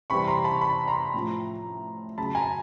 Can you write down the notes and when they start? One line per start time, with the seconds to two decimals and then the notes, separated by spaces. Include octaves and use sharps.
0.10 C3 E3 G3 B5 C#6
0.27 A#5 C6
0.44 A5 B5
0.61 A5 B5
0.88 A#5 C6
1.14 A2 F3
2.18 C#3 F#3 A5 B5
2.35 G#5 A#5